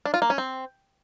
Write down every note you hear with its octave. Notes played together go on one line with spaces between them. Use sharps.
D4
F4
A#3
C#4
C4